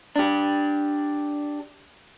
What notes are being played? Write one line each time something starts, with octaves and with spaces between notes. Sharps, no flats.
D4 G4